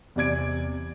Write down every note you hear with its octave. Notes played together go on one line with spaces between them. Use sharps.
E2 C3 D5 G#6 D7